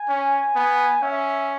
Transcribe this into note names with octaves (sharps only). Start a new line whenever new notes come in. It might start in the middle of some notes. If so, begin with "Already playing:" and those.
Already playing: G#5
C#4
B3
C#4 E5